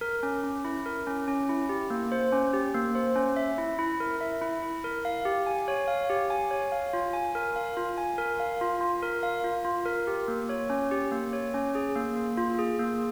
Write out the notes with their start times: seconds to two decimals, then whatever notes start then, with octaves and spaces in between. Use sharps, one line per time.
0.01 A#4
0.23 C#4
0.44 C#4
0.65 E4
0.86 A#4
1.07 C#4
1.28 C#4
1.49 E4
1.69 G4
1.90 A#3
2.12 C5
2.32 C#4
2.53 G4
2.74 A#3
2.95 C5
3.16 C#4
3.36 E5
3.58 E4
3.79 E4
4.00 A#4
4.21 E5
4.42 E4
4.63 E4
4.84 A#4
5.05 F5
5.25 G4
5.46 G#5
5.68 C#5
5.88 F5
6.10 G4
6.30 G#5
6.51 C#5
6.72 F5
6.93 F4
7.13 G#5
7.35 A#4
7.56 F5
7.77 F4
7.98 G#5
8.18 A#4
8.40 F5
8.61 F4
8.81 F4
9.03 A#4
9.23 F5
9.44 F4
9.65 F4
9.86 A#4
10.07 G4
10.28 A#3
10.49 C#5
10.70 C#4
10.91 G4
11.11 A#3
11.33 C#5
11.54 C#4
11.75 G#4
11.95 A#3
12.16 A#3
12.37 F4
12.59 G#4
12.79 A#3